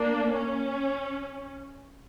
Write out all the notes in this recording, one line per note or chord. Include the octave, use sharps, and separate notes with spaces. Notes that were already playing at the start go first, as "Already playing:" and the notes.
Already playing: A#3 D4
C#4